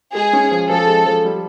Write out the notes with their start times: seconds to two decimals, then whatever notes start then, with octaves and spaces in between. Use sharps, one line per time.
0.15 G#3 G#4
0.33 C#4
0.51 F3
0.69 F3 A4
0.87 G#3
1.06 F3
1.25 G3